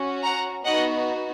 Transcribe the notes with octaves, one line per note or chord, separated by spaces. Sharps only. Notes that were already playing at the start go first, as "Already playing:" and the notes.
Already playing: C#4 F#4
F#5 A#5
B3 D#4 F#4 D#5 F#5